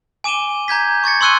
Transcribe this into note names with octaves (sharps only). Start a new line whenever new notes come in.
G#5 D6 D#7 E7 G7
A#5 G6 G#6 B6
C#6 G#6 A6 C#7
C6 C#6 E6 F#6 C#7 D#7